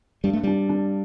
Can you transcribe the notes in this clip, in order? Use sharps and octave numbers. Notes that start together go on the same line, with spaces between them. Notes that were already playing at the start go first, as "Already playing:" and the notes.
G2 G3
A3
G3 D4
D4